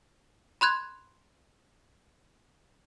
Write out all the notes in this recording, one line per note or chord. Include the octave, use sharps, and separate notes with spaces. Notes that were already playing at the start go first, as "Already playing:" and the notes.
B5 C6 F#6 G#6